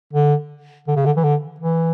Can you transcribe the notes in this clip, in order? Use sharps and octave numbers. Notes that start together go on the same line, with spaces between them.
D3
D3
C#3
D3
E3
D3
E3